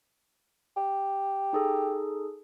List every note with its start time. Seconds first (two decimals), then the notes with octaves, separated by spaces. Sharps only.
0.77 G4
1.53 D#4 G#4 A4